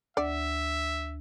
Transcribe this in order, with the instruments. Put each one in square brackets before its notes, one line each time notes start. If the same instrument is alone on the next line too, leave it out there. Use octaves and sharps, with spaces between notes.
[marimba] D2 [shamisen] D5 [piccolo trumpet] E5